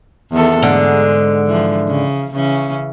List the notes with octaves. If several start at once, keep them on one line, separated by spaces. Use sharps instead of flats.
E2 D#3 A4
G#2 D3 G#3
E3 F3
C#3
C#3 E3 C#4